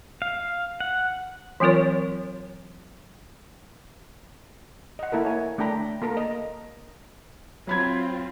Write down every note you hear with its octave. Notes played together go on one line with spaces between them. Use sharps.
F5
F#5
E3 F#3 C4 F4 A#4 C#5
D#5 F#5
A#3 E4 A4 A#4
C#5 G#5
A3 D4 A4 G5 A#5 B5
A#3 A4 A#4 A#5
D#5
F#3 C4 F4 B5 G#6